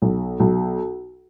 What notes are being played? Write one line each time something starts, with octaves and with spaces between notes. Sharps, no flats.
B1
B1